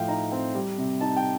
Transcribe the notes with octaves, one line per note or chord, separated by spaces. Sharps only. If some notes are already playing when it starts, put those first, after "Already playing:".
Already playing: A2 F3 F5 G5
D#4 A#5
C4
G3
C3
D#4 A5
G5